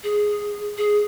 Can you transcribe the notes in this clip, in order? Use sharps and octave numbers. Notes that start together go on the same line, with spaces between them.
G#4
G#4